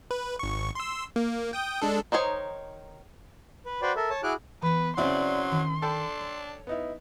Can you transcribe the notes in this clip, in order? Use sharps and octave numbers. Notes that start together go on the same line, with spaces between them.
B4
G#1 C#6
C6 E6
A#3
G5 D#6 G6
G#3 D4 A4
D#3 D#4 C5 C#5
B4
F#4 B4 C5 D5 G5
A4 A#4 E5
C#5 A5
E4 F#4 G#4 D6 F6 F#6
E3 B3 B4
C#3 F#3 C4 E4 D5 E5 C6
D#3
D4 A4 G5
C#5
B3 D#4 E4